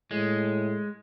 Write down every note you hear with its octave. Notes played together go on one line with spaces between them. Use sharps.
A2 G#3